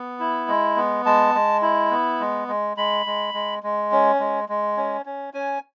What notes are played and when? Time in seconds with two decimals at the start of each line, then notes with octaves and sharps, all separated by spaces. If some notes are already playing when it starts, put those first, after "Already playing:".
Already playing: B3
0.20 E4
0.48 G#3
0.76 B3
1.05 G#3 A5
1.35 G#3
1.62 E4
1.91 B3
2.20 G#3
2.48 G#3
2.77 G#3 B5
3.06 G#3
3.34 G#3
3.63 G#3
3.92 C#4
4.20 G#3
4.49 G#3
4.77 C#4
5.06 C#4
5.34 C#4 G#5